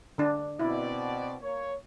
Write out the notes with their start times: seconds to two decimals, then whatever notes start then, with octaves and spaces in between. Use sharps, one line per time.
0.18 D3 D4
0.59 B2 C4 E4 D5
1.42 A#3 C#5